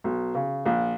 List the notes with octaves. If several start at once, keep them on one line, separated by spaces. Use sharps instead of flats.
B1
C#3
A#1